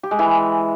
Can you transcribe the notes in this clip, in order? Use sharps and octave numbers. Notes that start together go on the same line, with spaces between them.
G4
G#3
E3